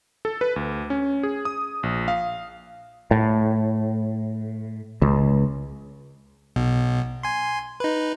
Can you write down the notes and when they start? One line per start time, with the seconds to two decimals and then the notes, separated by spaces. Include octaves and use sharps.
0.25 A4
0.41 B4
0.56 D2
0.90 C#4
1.23 G#4
1.45 D#6
1.83 A#1
2.08 F5
3.11 A2
5.02 C#2
6.56 B1 B2
7.23 G#5 C6
7.80 D#4 B4